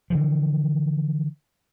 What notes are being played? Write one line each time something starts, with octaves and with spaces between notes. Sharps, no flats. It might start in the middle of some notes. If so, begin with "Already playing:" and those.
D3 E3 F3